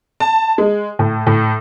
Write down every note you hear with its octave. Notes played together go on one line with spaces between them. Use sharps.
A5
G#3
A2
A2